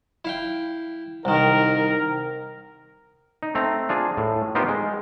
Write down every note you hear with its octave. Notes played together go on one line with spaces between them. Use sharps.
E4 F5 G5
C2 D#3 A#4
D#4
A3 C4 A#5
D4 F4 G#4
A2
B3 D#4 F4 G4 A#4 C5
G#3